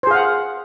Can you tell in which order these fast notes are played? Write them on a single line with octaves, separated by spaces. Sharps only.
C5 G#4 F5 F#5